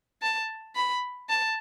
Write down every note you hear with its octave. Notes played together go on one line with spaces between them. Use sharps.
A5
B5
A5